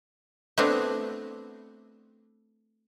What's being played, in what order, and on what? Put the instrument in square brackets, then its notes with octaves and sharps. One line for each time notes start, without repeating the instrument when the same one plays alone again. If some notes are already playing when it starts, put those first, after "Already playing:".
[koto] A3 B3 C4 D4 E4 F#4